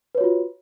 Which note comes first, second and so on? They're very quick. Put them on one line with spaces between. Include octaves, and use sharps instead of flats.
B4 C#5 F#4 F4